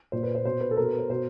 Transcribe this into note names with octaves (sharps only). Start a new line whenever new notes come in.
A#2 C5
B4
C5
B2 C5
B4
A4
B2 A#4
B4
C5
B2 C5